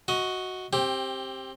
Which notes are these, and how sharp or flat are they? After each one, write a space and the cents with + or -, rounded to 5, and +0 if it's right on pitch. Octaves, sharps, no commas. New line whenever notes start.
F#4 +0 D#5 +20
C4 +20 G4 +0